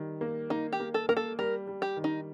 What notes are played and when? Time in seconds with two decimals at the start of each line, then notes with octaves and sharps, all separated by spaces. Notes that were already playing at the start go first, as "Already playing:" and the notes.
Already playing: D#3 G3
0.21 A#3
0.50 A#3 D#4
0.72 G4
0.80 A#3
0.94 A4
1.09 A#3 A#4
1.17 A4
1.39 G3 A#4
1.67 G3
1.82 G4
1.97 D#3
2.04 D#4